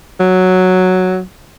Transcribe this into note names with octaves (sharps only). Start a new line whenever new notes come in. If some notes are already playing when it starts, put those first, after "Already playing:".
F#3